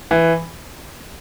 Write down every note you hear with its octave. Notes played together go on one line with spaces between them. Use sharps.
E3